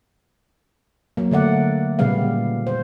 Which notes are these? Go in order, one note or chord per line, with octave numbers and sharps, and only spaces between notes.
F#3 A#3
D3 A3 D5 F#5
A#2 C#3 G3 B3 F5
C5